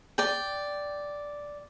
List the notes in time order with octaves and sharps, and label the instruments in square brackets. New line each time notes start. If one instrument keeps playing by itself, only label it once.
[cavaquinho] D5 G5